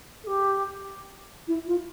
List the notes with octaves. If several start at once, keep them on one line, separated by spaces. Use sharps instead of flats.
A4
G4
E4
F4